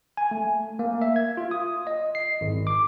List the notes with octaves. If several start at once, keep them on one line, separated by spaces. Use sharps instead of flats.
G#5
A3
A#3
E5
G#6
F4
D#6
D#5
C7
G#1
D6